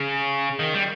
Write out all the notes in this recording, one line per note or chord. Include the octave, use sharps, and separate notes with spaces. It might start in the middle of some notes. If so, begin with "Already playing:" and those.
Already playing: C#3
D#3
G3